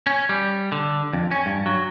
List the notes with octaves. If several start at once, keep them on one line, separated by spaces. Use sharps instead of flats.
C#4
G3
D3
F2
C#4
G2
F#3